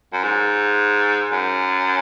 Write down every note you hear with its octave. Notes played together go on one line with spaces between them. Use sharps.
F#2
G#2
F#2